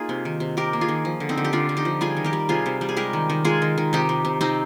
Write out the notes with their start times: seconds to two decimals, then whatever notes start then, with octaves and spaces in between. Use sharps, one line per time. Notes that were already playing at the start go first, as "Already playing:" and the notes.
Already playing: A#3 D#4 F4 G#4
0.09 C3
0.25 D#3
0.40 C3
0.57 C3 G4 A#4
0.73 A#3
0.81 F4 G#4
0.88 D#3
1.05 F3
1.20 D3
1.29 C4 D#4
1.38 D3
1.45 G4
1.53 D3 D4 F4
1.69 D3
1.77 D#4 G4
1.85 F3
2.01 G3 F4 G#4
2.17 D#3
2.24 G4 A#4
2.33 G3
2.49 C3 F4 G#4
2.66 C3
2.81 G3
2.89 G#4
2.97 G#3 G4 A#4
3.13 D#3
3.30 D#3
3.45 G#3 F4 G#4
3.62 D#3
3.78 D#3
3.93 C3 D#4 G4
4.09 C3
4.25 C3
4.41 C3 C4 D#4